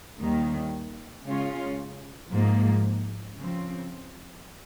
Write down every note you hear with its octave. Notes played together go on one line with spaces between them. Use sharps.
D#2 D#3 G3
C#3 G#3 C#4 F4
G#2 F3 A#3
C#3 F3 C4